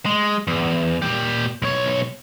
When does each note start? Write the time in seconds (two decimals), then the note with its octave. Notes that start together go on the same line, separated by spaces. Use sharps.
0.06 G#3
0.47 E2
1.02 A#2 G4
1.62 B1 C#5